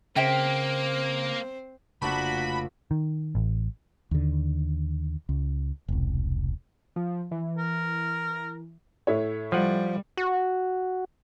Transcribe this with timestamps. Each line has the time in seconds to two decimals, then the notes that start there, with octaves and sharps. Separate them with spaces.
0.16 C#3 A#3 C4 C5 E5 G5
2.02 F1 C#3 F3 A3 A#3 D4 F#4 B5
2.91 D#3
3.35 A1
4.11 D#2 D3
5.29 C#2
5.88 E1 C2
6.96 F3
7.31 E3
7.58 A#4
9.07 A2 E4 C#5
9.52 F3 G3 F#5
10.17 F#4